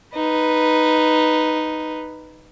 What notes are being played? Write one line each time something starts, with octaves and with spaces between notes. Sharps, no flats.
D#4 B4